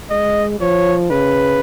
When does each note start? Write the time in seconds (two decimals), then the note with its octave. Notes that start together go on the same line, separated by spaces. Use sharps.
0.10 G#3 D#5
0.60 F3 C#5
1.11 C#3 B4